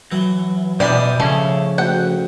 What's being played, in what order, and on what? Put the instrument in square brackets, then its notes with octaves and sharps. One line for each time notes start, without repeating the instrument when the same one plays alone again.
[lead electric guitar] E3 [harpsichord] F#3
[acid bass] B2 [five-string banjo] E3 G3 D5 [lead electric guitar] C5 A#5 [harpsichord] G#5 D#6
[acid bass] C#3 [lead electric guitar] F3 C#4 [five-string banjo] A3 G#4
[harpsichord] D2 [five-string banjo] F#5 G5